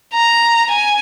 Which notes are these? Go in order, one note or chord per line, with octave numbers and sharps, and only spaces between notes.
A#5
G#5